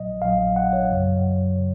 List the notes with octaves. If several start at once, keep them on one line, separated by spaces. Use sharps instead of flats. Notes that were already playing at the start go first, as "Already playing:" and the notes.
Already playing: A#1 A#2 F#3 D#5
A#1 A#2 F#3 F5
F#5
C#5
F#2 C#3 F#3
C#3